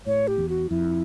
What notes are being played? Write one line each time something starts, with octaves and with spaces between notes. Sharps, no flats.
A2 C#5
G4
E2
F#4
F2 E4